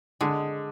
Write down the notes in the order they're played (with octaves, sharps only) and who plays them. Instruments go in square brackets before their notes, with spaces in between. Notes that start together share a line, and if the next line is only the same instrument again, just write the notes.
[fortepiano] D3 [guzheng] G#3